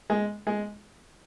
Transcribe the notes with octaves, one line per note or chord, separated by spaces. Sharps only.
G#3
G#3